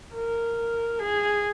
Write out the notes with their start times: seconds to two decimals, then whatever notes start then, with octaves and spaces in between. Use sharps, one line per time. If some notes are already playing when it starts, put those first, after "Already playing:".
0.14 A#4
0.99 G#4